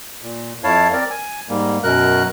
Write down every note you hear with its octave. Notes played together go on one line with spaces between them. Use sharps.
A#2
F2 E4 C#5 F5 A5
C4 A#4 D5
G#5
G#2 G3 A#3
F#2 B2 A#4 F#6